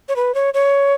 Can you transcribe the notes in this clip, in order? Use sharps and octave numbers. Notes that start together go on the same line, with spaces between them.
C#5
B4
C#5
C#5